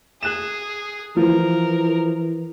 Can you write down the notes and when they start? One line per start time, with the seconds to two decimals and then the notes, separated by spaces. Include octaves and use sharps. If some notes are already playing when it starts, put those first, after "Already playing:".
0.23 G#4 F#6 E7
1.17 E3 F3 A#4